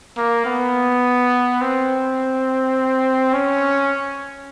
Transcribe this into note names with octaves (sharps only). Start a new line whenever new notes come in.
A#3
B3
C4
C#4